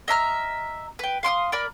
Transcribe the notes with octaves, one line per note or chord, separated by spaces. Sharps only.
D#5 E5 A#5 F6
B4 G5
F5 C6 D6 D#6
A#4 D5 B5